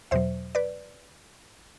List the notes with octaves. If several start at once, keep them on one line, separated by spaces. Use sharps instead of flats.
E2 B2 F#3 C5 E5
B4 D5